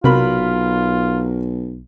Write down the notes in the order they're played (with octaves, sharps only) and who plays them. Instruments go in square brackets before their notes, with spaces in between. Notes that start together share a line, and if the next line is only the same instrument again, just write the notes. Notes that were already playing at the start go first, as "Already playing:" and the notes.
[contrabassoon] B1 [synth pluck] C3 [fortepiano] F#3 A#4 B5 [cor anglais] F4